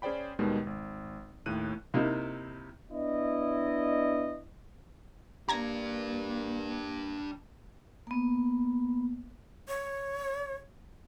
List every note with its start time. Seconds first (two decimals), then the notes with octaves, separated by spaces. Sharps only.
0.02 C#4 G#4 C5 D5 G5 B5
0.39 D#2 B2 D#3 G3 G#3
0.67 G#1
1.46 D#2 A2 F#6 D#7
1.94 C3 A#3 D#4 E4
2.90 B3 D4 E4 D#5
5.49 A#3 D4 G4 A#5 G#6 A#6
8.07 A#3 B3
9.68 C#5